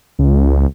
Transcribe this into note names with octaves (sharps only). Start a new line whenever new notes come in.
C#2